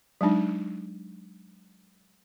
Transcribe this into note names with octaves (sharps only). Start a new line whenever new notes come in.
F#3 G#3 D4 D#4